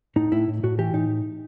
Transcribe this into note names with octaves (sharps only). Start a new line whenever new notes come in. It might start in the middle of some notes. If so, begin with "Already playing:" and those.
A2 D#4
A2 E4
A2
A2 F#4
E3 G4
A2 D#4